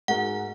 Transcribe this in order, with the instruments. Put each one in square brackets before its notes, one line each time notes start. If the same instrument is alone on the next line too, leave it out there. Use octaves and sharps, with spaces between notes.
[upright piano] G#2 G#3 F#4 A#4 [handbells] F#5